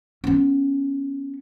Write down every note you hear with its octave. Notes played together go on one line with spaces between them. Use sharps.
B3 C#4